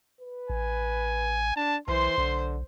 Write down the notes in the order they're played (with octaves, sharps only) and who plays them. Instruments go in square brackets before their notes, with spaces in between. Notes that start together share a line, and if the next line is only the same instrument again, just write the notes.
[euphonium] B4
[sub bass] A1 [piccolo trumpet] G#5
[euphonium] D4 [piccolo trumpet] A5
[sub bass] B1 [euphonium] E3 [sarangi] C5 [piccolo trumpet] C6
[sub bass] B1 [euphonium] D3